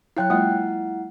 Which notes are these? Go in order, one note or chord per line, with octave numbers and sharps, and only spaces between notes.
F#3 E4 C#5 F5 G5 F#6
G#3 A#3 E4 F4 F#5